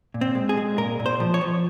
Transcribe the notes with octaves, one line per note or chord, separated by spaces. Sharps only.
A#2
C4
G#3
G#4
G#3
A#2 A#4
A#2
C5
F3
C#5
F3